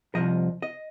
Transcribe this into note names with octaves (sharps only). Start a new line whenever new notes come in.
C2 A#2 F3 D#5
D#5